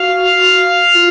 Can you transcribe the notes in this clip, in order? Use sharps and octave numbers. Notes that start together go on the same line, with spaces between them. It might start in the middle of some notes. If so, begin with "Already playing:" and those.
Already playing: F#4 F5
F4